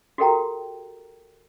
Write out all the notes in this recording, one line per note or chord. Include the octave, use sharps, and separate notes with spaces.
F#4 G4 A4 A#4 G5 A#5